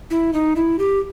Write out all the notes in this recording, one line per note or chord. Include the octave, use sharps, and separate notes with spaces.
E4
D#4
E4
G4